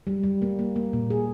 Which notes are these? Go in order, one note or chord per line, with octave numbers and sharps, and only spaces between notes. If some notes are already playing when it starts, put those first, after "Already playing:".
G3
G3
A#3
A#3
A#3
A#2
G#4